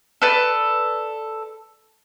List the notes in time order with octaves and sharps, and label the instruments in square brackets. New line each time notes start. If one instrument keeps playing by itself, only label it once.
[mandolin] A4 B4 D5